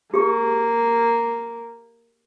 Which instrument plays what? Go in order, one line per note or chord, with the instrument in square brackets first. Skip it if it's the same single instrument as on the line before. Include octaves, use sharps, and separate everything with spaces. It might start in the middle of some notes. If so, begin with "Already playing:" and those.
[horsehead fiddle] A#3 [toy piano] G4 G#4